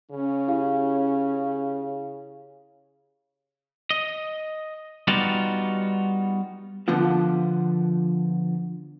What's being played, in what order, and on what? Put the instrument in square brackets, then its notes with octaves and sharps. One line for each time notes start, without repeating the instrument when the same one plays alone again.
[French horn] C#3 [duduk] C#4
[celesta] E4 G4 F5
[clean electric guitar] D#5
G3 B3 D#4 F4 F#4 D5
[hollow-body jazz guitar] D3 F3 B3 F4